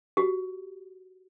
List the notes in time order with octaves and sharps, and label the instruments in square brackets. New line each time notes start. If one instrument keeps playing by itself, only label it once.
[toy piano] F#4 G4